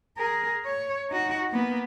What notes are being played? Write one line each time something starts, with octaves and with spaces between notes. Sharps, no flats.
G#4 A#4
C#5
D#4 F#4
A#3 B3